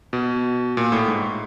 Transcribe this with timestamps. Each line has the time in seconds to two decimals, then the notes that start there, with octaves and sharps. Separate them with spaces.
0.13 B2
0.77 A#2
0.92 A2
1.08 G#2